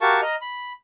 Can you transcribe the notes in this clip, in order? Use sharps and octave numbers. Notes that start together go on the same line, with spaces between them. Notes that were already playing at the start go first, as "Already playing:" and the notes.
F#4 G4 A#4 F5 A5 C#6
D#5 A#5 F6
B5